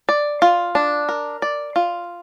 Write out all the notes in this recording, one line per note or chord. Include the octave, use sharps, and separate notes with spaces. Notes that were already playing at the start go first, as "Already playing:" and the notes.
D5
F4
D4
A#4
D5
F4